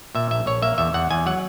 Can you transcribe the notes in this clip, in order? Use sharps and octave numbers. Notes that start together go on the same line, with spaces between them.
A#2 E5
A#1 E5
A#1 C#5
A#3 E5
E2 E5
E2 F#5
E2 G#5
F#3 F#5